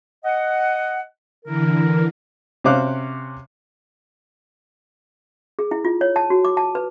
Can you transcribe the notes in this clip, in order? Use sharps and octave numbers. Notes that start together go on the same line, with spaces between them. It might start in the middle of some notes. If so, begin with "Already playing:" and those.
D#5 F#5
D3 E3 A#4
C3 C#4 C5 F5 D6 F#6
G#4
E4
F4
C#5
A5
F#4
D6
A5
B4